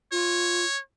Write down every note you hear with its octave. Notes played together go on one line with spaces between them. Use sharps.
F4 C#5